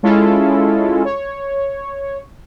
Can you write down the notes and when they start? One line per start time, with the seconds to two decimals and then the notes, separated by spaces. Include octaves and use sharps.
0.03 G#3 C#4 E4 F4 A4
1.05 C#5